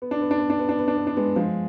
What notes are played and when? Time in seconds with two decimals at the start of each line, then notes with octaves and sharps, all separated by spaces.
0.02 B3
0.11 D4
0.21 B3
0.31 D4
0.40 B3
0.50 D4
0.59 B3
0.69 D4
0.79 B3
0.88 D4
0.97 B3
1.07 D4
1.17 G#3 B3
1.36 F3 G#3